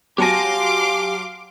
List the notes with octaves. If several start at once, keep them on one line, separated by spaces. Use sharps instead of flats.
F#3 G4 F5 G#5 A5 C6 D6 A#6